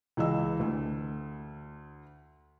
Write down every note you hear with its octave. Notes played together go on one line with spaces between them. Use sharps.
C#2 E3 D#5 E6
D2